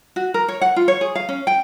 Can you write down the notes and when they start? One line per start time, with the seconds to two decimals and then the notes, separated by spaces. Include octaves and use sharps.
0.16 F#4
0.34 A#4
0.48 C#5
0.61 F#5
0.76 F4
0.88 C#5
1.01 G#4
1.15 F5
1.29 C#4
1.47 G5